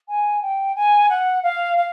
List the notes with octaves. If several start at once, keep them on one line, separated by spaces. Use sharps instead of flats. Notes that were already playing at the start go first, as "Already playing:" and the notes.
G#5
G5
G#5
F#5
F5
F5